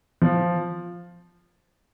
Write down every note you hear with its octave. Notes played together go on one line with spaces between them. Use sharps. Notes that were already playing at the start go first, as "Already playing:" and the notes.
F3